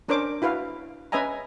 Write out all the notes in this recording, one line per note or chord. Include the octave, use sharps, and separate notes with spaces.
C#4 D4 A#4 C5 C#5 D6
E4 F#4 B4 F5
C#4 B4 D#5 E5 G#5 A#5